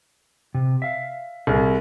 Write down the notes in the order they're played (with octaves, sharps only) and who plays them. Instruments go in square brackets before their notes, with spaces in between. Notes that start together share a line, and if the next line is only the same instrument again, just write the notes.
[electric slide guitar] C3
E5 F5
[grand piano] C2 [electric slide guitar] G#4